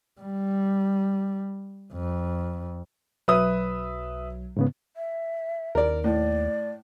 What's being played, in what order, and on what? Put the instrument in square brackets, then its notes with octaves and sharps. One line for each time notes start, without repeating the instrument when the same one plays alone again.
[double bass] G3
F2
[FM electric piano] B1 F#3 [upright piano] B4 E5 D#6
[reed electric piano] G#2 C#3 B3
[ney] E5
[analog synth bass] D#2 [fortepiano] A#4 D5
[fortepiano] A2 [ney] D5